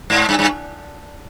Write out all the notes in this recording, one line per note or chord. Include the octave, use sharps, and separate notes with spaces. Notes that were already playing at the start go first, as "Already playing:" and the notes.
G#2
G2
G2